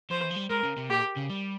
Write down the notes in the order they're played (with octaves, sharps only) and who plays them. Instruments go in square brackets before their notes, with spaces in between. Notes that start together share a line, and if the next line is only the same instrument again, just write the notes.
[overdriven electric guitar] F3 [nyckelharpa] C5
[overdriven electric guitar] E3
F3
G3
[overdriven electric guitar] G#3 [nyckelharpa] A#4
[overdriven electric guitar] C#3
C3
[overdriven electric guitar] A#2 [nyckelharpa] G4
[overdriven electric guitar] C#3
G3